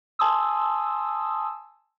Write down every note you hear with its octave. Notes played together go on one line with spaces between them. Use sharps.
G#5 A5 C6 D#6 E6